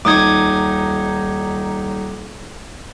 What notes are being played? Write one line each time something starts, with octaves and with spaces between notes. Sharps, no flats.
D#1 D#4 D6 D#6 G#6